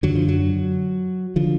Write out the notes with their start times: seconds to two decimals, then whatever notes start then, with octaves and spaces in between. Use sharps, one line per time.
0.03 F#2 D3 F#3
0.15 F3
0.28 F#3
1.36 D3 F3